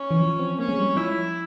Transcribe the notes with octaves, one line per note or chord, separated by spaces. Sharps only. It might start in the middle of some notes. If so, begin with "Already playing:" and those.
Already playing: C#4
E3
F3
C4
A#3 C#4
G#3
G3
F3 E4